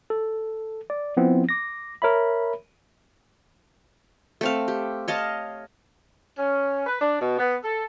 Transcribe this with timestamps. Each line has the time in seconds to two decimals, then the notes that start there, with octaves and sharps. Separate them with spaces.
0.10 A4
0.90 D5
1.17 F3 B3 C4 E4
1.49 D6 A#6
2.02 A#4 C#5 E5 B5
4.41 A3 C4 F5
4.68 G4
5.08 C#5 D#5 F5 A5
6.38 C#4
6.87 B4
7.01 D4
7.21 B2
7.39 B3
7.63 A4